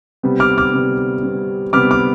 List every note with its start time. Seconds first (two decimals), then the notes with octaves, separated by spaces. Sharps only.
0.23 C3 G3 B3
0.40 D6 F6
0.58 D6 F6
0.74 C3 G3 B3
1.23 C3 G3 B3
1.73 C3 G3 B3 D6 F6
1.91 D6 F6